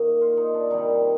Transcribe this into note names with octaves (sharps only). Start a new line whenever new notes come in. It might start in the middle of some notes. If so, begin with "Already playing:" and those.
Already playing: D#3 A#3 D#4
F4
D#4
D4
C3 D#3 G3 D#4